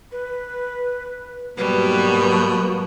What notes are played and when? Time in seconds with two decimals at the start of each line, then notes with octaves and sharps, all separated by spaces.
0.12 B4
1.58 G#2 B2 F#3 G3 A#3 B4